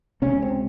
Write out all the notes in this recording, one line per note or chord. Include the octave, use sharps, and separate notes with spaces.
C#2 C3 C#4
C4